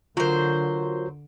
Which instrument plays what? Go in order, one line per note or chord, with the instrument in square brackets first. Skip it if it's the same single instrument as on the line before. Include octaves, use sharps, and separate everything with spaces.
[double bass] D3 [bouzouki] F#3 C5 [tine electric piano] F4 A#4